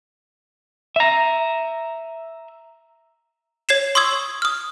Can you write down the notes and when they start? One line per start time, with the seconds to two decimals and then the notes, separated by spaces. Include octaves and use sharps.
0.96 E5 A#5
3.69 C#5 G#6 C7 E7
3.95 C6 C#6 D#6 E6 G#6
4.42 D#6 F6